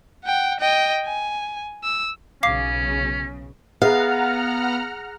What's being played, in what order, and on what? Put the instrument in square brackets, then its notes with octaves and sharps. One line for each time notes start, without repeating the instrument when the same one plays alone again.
[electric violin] F#5 G5
D#5 G5
G#5
E6
[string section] B1 C#3 [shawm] C#4 [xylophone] F5 D6 C7
[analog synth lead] B3 [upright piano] G#4 [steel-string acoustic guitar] F5 [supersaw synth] F#5 A#5 F6